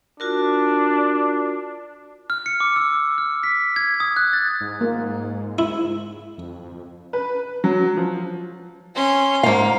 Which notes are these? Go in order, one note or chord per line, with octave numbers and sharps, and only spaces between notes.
D4 F4 F#4 A#4
F6
C#7
D6
E6
F6
B6
G#6
D#6
F#6
A6
G#2
A#3
E4
F2
B4
F#3
F3
C#4 C6
G#2 A#3 F5